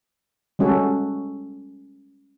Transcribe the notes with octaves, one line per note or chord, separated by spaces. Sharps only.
G3 G#3 C#4 F#4 A4